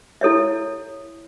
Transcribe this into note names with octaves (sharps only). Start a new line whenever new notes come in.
E4 A4 C#5 E5